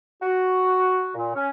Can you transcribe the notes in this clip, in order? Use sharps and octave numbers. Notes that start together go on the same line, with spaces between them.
F#4
A#2
C#4